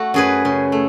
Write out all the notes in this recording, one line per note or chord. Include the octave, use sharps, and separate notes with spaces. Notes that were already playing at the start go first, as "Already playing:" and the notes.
Already playing: A3 F#4
F#2 G#4 B4
C#3
A3